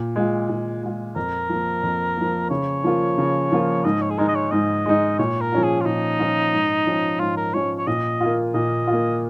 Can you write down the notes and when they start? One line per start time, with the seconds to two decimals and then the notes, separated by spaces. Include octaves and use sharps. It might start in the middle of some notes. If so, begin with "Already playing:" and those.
Already playing: A#2
0.16 G#3 F4
0.49 A#2
0.83 G#3 F4
1.16 F2 A#4
1.49 F3 A#3
1.83 F2
2.17 F3 A#3
2.50 C#3 C#5
2.84 F3 A#3 F4
3.18 C#3
3.52 F3 A#3 F4
3.84 G#2 D#5
4.01 C#5
4.10 G#4
4.18 G#3 D#4 A#4
4.28 D#5
4.35 C#5
4.51 G#2 D#5
4.86 G#3 D#4
5.19 A#2 C#5
5.41 A#4
5.52 F3 C#4 F4
5.64 G#4
5.81 F4
5.85 A#2 D#4
6.19 F3 C#4 F4
6.53 G#2
6.87 F3 C#4
7.20 G#2 F4
7.37 A#4
7.54 F3 C#4 C#5
7.78 C#5
7.87 A#2 D#5
8.21 A#3 F4
8.54 A#2 D#5
8.87 A#3 F4